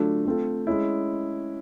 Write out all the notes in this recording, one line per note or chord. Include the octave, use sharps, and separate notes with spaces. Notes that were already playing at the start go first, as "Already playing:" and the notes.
Already playing: D3 F#3 A3 D4 F4
A3 C4 F4 A4
G#3 C#4 E4